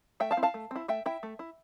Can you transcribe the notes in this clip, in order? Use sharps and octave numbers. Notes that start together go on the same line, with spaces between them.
A3 E5 G5
F5 A5
C4 E4
F5 A5
A3
C4 E4
A3 E5 G5
E4 E5 G5
A3
E4